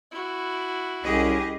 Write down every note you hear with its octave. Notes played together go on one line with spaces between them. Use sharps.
E4 F#4
C2 C#4 G4 G#4 D#5